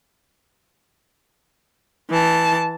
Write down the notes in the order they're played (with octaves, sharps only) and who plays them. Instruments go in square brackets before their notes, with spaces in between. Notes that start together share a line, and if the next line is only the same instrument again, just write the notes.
[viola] E3 A5